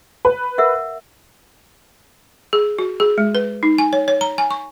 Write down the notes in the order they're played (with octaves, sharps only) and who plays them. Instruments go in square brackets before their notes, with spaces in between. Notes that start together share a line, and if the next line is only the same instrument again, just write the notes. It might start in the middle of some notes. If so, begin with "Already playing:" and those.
[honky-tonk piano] B4
[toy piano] A#4 E5 F#5
[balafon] G#4
F#4
G#4
G#3
B4
D#4
G#5
C#5
C#5
A#5
G#5
C#6